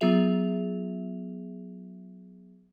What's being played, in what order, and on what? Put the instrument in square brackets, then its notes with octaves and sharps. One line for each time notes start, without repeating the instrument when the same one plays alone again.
[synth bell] F#3 B3 F4 G#4 E5 F7